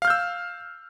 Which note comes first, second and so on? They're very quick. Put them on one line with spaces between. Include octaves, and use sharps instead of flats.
F5 F6 G6 E6